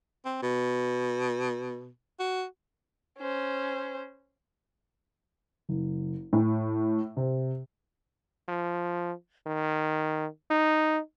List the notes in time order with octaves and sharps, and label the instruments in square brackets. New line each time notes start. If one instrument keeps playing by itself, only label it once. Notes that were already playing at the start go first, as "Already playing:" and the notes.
[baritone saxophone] C4
B2
F#4
[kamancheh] C#4 C5
[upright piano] F#1
A2
C3
[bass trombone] F3
D#3
D#4